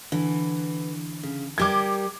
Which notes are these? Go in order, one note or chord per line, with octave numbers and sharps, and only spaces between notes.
D3 E3
C#3
G3 G4 A#4 D6 G#6